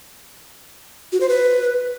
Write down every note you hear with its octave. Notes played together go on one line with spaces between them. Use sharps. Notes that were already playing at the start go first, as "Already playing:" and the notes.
F#4
C5
B4